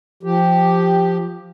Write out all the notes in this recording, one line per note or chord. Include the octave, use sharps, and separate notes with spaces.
F3 G4